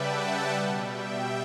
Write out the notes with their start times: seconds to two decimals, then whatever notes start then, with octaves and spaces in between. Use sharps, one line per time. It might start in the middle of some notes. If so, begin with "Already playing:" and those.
Already playing: C#3 G3 B4 D5 E5 F#5 G5 A5
0.16 E5 G5
0.53 B2 G3
0.89 E5 G5